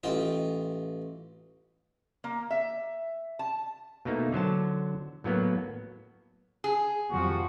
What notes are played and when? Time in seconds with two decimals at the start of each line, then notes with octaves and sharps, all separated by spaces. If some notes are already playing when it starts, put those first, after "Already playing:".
0.03 A1 F4 D#5 G5
2.24 A#3
2.50 E5
3.39 A5
4.05 B2 A3 A#3 D#4
4.32 D3 F#3 C5 A5
5.24 A2 F#3 A#3 B3
6.64 G#4
7.11 F2 F3 G3 F#4